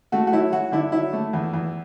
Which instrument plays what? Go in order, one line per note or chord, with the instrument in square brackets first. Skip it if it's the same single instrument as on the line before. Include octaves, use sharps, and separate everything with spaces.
[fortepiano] A3 F#4
F#4
F#3 E4
F#3 F#4
D3 E4
F#3 E4
A3
E2
E2